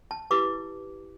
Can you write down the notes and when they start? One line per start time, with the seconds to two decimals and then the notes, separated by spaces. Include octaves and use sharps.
0.11 A5
0.31 E4 G4 B4 D6